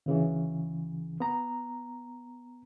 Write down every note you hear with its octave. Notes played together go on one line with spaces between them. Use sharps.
D2 C#3 E3
B3 A#5